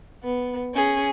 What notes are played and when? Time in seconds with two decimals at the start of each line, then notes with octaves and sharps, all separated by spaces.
0.24 B3
0.74 C#4 G#4